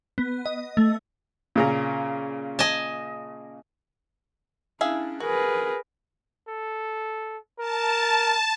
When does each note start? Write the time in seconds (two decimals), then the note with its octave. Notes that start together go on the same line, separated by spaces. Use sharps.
0.18 B3
0.46 D#5
0.77 A3
1.56 A#2 C#3 A#5
2.59 D#5 G#5 A5
4.81 C#4 D4 E4 G#4 E5 F5
5.20 F#4 G#4 A#4 B4
6.49 A4
7.59 A#4 A5